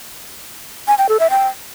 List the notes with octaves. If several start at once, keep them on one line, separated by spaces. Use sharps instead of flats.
G#5
G5
A4
E5
G5